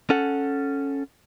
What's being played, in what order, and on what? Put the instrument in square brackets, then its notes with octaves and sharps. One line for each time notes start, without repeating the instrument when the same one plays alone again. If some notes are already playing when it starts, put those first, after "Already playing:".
[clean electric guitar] C#4 A4 F#5